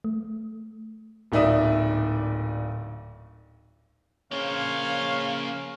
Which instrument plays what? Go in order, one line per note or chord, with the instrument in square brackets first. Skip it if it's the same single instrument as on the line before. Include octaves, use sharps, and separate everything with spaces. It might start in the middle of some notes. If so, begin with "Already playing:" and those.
[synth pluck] A3
[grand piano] D1 A#2 D#4 D5 E5 D#6
[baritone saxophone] C#3 [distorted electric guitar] A#3 C5 [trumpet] C#5 [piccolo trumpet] F5